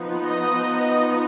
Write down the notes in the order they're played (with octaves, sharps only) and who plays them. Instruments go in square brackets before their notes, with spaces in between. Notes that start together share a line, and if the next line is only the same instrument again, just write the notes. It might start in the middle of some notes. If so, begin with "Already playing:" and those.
Already playing: [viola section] F3 B3 D#4
D#5